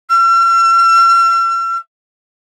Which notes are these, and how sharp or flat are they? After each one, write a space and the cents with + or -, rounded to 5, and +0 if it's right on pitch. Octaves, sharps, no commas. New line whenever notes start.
E6 +45